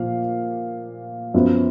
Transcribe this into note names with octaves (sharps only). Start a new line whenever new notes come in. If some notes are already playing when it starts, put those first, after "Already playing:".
Already playing: A#2 F3 A#3 F5
F#2 F3 B3